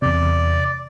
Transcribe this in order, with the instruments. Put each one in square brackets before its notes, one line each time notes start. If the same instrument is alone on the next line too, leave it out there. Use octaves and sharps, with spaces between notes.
[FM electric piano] E2 C3 [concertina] D5